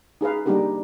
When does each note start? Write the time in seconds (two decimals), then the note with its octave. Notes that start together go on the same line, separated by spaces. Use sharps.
0.21 D#4 G#4 B4 F5
0.46 G3 A#3 D4 D#4 G4 A#4